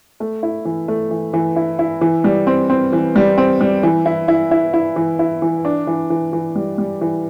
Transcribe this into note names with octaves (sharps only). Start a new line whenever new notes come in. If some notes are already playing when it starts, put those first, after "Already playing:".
A3
E4
E3
A3
E3
E3
E4
E4
E3
G3
C4
C4
E3
G3
C4
G3
E3
E4
E4
E4
E4
E3
E4
E3
D4
E3
E3
E3
G3
G3
E3